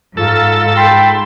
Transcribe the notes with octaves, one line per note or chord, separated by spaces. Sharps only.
G#2 F4 A4 E6
G5 B5 C6